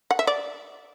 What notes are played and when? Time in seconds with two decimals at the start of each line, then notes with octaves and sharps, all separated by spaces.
0.11 F#5
0.19 E5
0.27 D5